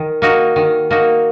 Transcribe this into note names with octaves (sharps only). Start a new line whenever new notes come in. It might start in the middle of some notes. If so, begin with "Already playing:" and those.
Already playing: D#3
A#3 D#4 F#4
D#3
A#3 D#4 F#4